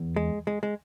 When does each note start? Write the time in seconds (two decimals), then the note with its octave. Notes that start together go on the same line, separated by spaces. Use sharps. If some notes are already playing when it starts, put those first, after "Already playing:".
Already playing: E2
0.16 G#3
0.47 G#3
0.63 G#3